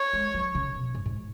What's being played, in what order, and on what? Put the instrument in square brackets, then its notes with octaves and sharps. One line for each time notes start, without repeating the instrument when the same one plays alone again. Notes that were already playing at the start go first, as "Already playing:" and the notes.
Already playing: [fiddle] C#5
[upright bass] G#3
F#3
C#3
B2
G#2
G#2